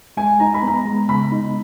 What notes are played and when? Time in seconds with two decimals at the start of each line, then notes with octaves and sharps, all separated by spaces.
0.17 G#3 G#5
0.40 D#4 A#5
0.54 B5
0.63 B3 A#5
0.85 G#3
1.08 C#3 B5
1.32 D#4